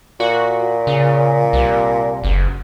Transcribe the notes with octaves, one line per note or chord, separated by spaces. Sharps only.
A#2 F#4
C#3
C2
F#1